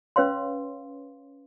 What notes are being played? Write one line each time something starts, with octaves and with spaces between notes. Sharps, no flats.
C#4 B4 C#5 F5 C6